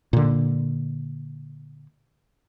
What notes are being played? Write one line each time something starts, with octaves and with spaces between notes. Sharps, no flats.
A#2 D3